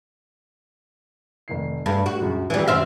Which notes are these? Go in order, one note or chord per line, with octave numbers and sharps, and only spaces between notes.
F1 D#3 C7
G2 G3 A3
F#4
C#2 F#2
G#1 E3 F#3 G3 G#4
F#2 D#3 F#3 C4 E5 F5